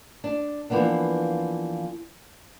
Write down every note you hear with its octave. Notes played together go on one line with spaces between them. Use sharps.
D4
E3 F3 A#3 B3 D4